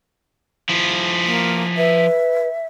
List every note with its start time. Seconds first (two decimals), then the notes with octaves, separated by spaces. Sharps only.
0.69 F3 E4
1.25 A#3
1.77 B4 E5